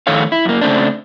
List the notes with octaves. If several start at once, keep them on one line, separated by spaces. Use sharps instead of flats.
F2 A2 D#3 A4 C#5 F5
E4
F#2 A#3
C#3 A3 C4 D4